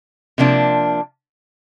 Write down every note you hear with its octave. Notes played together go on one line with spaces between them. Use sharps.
C3 F3 A#3 D4